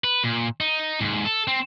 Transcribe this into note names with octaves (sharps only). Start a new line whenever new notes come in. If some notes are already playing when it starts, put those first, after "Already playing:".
B4
A#2
D#4
D#2 G#2
A4
C4